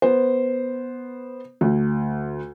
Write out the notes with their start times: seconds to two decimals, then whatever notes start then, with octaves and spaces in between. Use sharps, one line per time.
0.02 B3 C5
1.61 D2